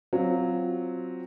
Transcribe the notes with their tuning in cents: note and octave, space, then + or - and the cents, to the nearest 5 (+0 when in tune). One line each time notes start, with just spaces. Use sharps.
F#3 +0 C4 +0 F4 +0